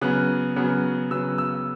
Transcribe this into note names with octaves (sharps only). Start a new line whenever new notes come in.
C#3 F#3 B3 F#6
C#3 F#3 B3
C#3 F#3 B3 E6
E6